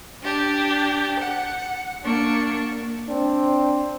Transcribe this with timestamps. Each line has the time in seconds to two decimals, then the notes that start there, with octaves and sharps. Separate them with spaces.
0.23 D4 G4
1.20 F#5
2.04 A#3 D4 C#6
3.09 C4 D4